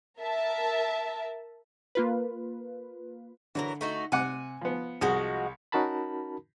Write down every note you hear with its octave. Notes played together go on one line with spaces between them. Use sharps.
A#4 E5 A5
A#3 F4 B4
D3 E3 F#3 A#4
A3 D#4 F#4
C3 F#5 G#5 D6
F3 B3
C2 F3 G#3 F#4
C#4 D#4 F#4 A#4 A5 B5